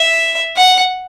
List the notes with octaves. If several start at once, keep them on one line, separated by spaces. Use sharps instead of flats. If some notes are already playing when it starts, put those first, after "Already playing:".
Already playing: E5
F#5